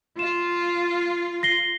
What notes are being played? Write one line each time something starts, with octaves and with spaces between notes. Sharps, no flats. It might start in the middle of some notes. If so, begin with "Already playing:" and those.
F4 E7
A#6 C7 G7